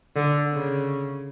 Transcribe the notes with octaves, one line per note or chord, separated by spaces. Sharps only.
D3
C#3